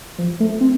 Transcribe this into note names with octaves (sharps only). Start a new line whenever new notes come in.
F3
A3
C4